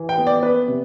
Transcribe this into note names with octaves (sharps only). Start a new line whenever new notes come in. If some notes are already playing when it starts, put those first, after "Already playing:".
Already playing: E3
G5
B3
D5
B3 B4
C3